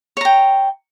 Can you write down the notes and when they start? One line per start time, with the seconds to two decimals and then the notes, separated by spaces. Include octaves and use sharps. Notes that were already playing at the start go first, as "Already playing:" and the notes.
0.17 C#5
0.21 A#5
0.25 G5